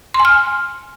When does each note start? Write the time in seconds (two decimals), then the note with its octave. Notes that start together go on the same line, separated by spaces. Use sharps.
0.14 C6
0.20 G#5
0.25 F6